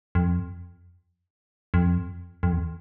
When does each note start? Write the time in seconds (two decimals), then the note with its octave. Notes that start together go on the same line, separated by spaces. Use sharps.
0.15 F2
1.74 F2
2.43 F2
2.53 E2